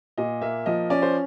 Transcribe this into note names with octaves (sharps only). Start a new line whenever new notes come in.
A#2 D#5
A#3 E5
F3 D#5
C#4 D5
C5